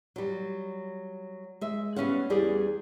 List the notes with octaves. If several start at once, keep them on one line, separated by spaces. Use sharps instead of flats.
F#3 G3
G#3 E5
G3 B3 C#4 C#5 F5 F#5
E2 G3 G#4 D5